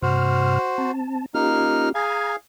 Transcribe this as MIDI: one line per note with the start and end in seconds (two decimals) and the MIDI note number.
0.02 0.59 43
0.02 0.59 48
0.02 0.91 66
0.02 0.91 72
0.02 0.59 89
0.78 1.26 60
0.78 1.26 81
1.35 1.89 58
1.35 1.92 61
1.35 1.89 63
1.35 1.92 65
1.35 1.92 67
1.35 1.89 89
1.95 2.36 68
1.95 2.36 77
1.95 2.36 80
1.95 2.34 82
1.95 2.34 92